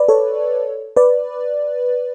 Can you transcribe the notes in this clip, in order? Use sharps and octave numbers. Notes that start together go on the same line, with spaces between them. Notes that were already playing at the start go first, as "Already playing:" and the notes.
Already playing: B4 D5
A4 C#5
B4 D5